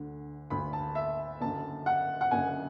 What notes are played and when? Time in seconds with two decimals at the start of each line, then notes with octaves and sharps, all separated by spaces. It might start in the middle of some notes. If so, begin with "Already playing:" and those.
Already playing: D2 D3
0.50 D2 D3 B5
0.73 A5
0.95 E5
1.41 F#1 F#2 D3 A5
1.86 F#5
2.21 F#5
2.31 F#1 F#2 D3 G#5